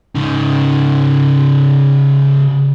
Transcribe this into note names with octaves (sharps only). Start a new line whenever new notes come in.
C#3 D#4